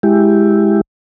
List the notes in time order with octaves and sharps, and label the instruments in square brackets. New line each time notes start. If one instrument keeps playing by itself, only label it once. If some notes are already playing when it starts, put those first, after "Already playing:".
[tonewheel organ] G#3 E4 G4